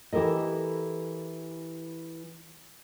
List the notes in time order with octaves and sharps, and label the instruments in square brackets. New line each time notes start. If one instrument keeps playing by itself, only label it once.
[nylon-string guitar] E3 E4 G4 A4 A#4 D#5